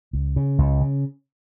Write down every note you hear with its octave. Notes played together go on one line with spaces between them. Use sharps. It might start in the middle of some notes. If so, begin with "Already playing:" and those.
C#2
C#3
C#2
C#3